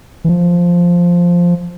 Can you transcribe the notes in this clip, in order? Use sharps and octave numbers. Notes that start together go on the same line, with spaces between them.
E3
F3